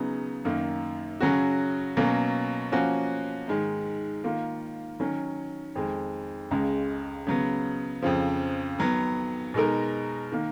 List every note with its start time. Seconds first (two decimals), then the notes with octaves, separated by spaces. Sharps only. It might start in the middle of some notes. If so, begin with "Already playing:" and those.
Already playing: C#3 F#3 B3 D#4 G#4
0.45 F#2 D#3 A#3
1.20 C#3 F#3 C#4 F#4
1.97 B2 F#3 A#3 C#4
2.72 F3 A#3 C#4 F#4
3.48 G#2 D#3 G#3
4.24 D#3 A#3 F4
5.00 D#3 F#3 C#4
5.75 F2 D#3 G#3
6.51 C#2 C#3 G#3
7.27 C#3 F#3 B3
8.02 F2 C#3 F3
8.79 D#3 F#3 B3
9.54 B2 G#3 D#4 A#4
10.32 D#3 A#3